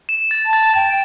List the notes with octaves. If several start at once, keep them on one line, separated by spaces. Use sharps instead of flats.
E7
A6
A5
A6
G5 A6